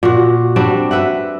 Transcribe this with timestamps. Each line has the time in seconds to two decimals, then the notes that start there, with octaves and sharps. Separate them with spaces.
0.03 A#2 F#4
0.56 G3 C4 D4 F#4
0.91 B4 E5 F#5